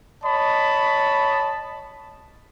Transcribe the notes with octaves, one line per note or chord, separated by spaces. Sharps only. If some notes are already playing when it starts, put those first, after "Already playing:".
C#5 D#5 A5 B5